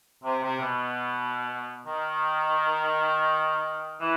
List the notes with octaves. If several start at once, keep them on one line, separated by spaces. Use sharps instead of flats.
C3
C3
B2
D#3
E3